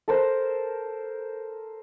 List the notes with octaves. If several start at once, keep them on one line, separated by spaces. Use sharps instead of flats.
A4 A#4 C5